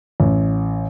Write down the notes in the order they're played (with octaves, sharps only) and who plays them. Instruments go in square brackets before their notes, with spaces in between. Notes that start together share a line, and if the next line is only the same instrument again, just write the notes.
[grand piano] A1